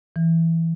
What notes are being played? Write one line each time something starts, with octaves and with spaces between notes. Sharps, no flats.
E3